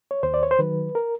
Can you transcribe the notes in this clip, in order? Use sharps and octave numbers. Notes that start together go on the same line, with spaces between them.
C#5
D#2 C5
D5
C#5
C5
D#3 F#3 B4
A#4